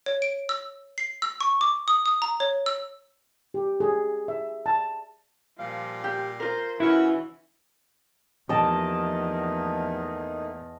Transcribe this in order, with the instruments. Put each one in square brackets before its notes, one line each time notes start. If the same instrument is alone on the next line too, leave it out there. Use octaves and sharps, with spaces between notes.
[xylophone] C#5
D7
E6
C7
E6
C#6
D6
D#6
D#6
A#5
C#5
E6
[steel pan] G4
G#4
E5
A5
[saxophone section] A#2 G3 F5 [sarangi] F3
[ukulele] G4
[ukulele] F4 A#4 [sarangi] C5
[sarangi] E3 [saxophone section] C#4 F#4 [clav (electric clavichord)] E4
[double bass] E2 [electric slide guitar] F3 G4 [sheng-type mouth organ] A3 A#3 D#4 [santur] D#5 A5